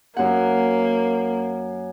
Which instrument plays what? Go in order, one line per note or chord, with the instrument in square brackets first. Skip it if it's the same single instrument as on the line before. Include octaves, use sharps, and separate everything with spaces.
[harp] F#2 F#5 [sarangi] A#3